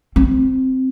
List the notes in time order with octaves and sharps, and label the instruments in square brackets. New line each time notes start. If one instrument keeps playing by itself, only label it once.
[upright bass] C4